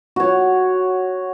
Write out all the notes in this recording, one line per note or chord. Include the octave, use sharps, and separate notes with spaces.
F#4 C#5